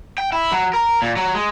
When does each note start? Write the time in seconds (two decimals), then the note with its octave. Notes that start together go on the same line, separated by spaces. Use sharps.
0.18 G5
0.32 E4
0.52 F#3
0.74 A#4
1.02 A#2
1.17 F#3
1.35 G#3